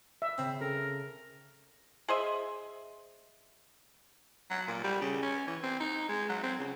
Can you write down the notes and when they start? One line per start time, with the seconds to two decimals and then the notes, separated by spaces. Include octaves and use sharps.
0.22 E5
0.38 C#3 C4
0.61 C#3 A4 A#4
2.08 G#4 C5 D#5 E5
4.50 F#3
4.68 A#2
4.84 G3
5.01 C#3
5.22 C#4
5.47 E3
5.63 C4
5.80 D#4
6.08 G#3
6.29 F#3
6.43 C4
6.59 C#3